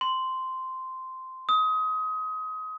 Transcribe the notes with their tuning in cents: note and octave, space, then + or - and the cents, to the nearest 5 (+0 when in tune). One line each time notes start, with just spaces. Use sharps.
C6 -10
D#6 +25